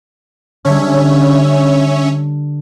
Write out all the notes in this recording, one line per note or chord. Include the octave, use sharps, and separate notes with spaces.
D3 G3 C#4 C#5 E5